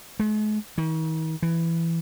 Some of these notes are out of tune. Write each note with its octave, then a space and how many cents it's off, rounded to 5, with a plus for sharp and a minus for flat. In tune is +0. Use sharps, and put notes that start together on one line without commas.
G#3 +45
D#3 +45
E3 +10